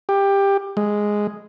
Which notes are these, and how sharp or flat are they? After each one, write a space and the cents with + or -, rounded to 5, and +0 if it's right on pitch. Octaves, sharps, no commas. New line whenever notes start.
G4 +15
G#3 +0